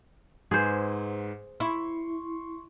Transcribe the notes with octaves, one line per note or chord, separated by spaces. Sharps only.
G#2 G#4 B4 C5
E4 C6 C#6